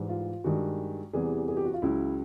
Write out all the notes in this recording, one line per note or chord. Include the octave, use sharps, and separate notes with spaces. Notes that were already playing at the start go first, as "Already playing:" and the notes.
Already playing: G#2 E3 G3
F4
G2 D#3 G#3 F#4
E2 C3 E3 G3 G#4
G#4
G4
F#4
F4
C#2 C#3 F#3 E4